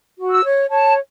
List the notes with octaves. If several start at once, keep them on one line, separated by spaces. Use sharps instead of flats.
F#4
E6
C#5
C#5 A5